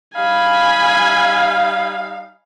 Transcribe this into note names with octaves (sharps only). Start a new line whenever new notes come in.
G3 D#4 F5 G#5 B5